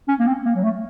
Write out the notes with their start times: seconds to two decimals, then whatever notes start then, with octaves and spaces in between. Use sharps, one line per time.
0.08 C#4
0.19 A#3
0.27 C4
0.46 A#3
0.56 F#3
0.64 A3